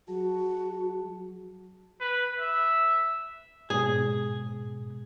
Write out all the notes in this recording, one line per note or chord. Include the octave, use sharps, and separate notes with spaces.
F#3 F#4 G#4 A5
B4
E5
G#2 B2 G#4